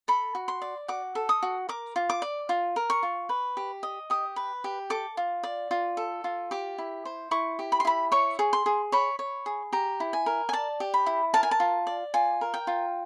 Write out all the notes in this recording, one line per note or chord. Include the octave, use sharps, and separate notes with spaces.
A4 B5
F#4
C6
D5
F#4 D6
A4
D#6
F#4
A#4 D6
F4
D6
D5
F4
A#4
C#6
F4
B4
G4
D#5
G4 D#6
B4
G4
A4 D6
F4
D5
F4
A4
F4
G4 D6
E4
C5
E4 C#6
G4
B5
C6
E4 B5
C#5 C#6
G#4
C6
G#4
C#5 B5
C#5
G#4
G4 A#5
E4
G#5
A#4
G#5
D5 A5
G4
B5
E4
A#4 A5
G#5
A5
F4
D5
F4 G#5
A#4
G5
F4